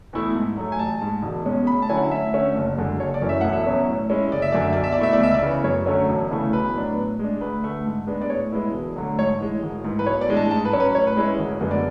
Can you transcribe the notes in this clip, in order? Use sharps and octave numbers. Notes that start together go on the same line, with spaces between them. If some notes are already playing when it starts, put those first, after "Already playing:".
E2 B2 A3 E4
G#2
F#3 A3
G#5
A1 A5
G#2 G#3
E1
E2 B2 G#3 C#4
D2 B5
A5
D3 F#3 C#4 E4 G#5
F#5
D2 E5
D3 A3 C#4
F#1
F#2 D3 G#3
F#1 C#5
D5
F#2 E3 A3 C#4
E5
E1 F#5
E5
E2 B2 F#3 C#4
A2
G#3 C#4 E4
F#1 D5
E5
F#2 D3 D5
E5
B1 D5
E5
D5
B2 A3 E4 E5
D5
C#2 E5
D5
C#3 E3 B3
F#2 C#5
D3 F#3 A3 C#4
E1
D2 C#3 E3 A3
B1 B4
A2 F#3 B3 D4
A2
G#3 D4
D2 B4
D3 A3
G#2
G#3 B3 D4
D5
A2 C#5
G#3 B3 E4
E1
D2 D3 F#3
G#2 C#5
E3 G#3
G#1
G#2 E3
B4
B1 C#5
D5
A2 E3 G#3 D4
A5
G#2 A5
B4
F#3 C#4
B4
A2 C#5
B4
G#3 C#4 E4 C#5
G#1
F#2 D3 G#3 B3
D5